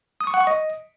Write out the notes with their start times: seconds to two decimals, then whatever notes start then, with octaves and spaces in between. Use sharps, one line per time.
0.21 D#6
0.27 C#6
0.34 F#5
0.40 C#6
0.47 D#5